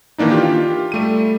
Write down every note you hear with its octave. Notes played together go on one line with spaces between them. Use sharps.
D#3 E3 A#3 D4 D#4
F4 G4
G3 A3 D#7